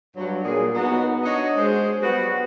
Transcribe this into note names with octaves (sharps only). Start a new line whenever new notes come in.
G2 F#3
A#2 G#4
B3 D#4 F#4
D4 F#4 C#5 D#5
G#3 G#4 C5
F#3 G3 B3 F#4 B4 F#5